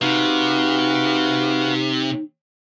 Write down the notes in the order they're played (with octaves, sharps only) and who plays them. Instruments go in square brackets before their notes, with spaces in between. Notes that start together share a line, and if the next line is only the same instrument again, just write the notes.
[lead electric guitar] C3 [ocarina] D#4 [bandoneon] F#4 B4 F5